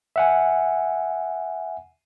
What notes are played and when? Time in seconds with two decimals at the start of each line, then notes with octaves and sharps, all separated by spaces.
0.16 E5 F#5 G#5